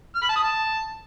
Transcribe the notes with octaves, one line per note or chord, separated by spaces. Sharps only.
F6
B5
A5
D#6
A5